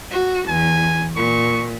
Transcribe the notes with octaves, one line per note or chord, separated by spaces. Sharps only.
F#4
E2 G#5
A#2 C#6